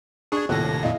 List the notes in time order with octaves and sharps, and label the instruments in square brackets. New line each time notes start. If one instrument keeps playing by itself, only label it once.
[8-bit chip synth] D4 G#4 [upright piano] C#6 G#6
[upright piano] D#1 A4 F#6 [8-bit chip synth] A2 C3 A#6
[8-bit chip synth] F2 A#2 [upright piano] E4 D#5 F5